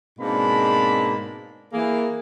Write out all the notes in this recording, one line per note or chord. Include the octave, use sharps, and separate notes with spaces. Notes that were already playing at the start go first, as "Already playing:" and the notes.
G#2 B2 A#3 C4 D4 B5
E3 A#3 G#4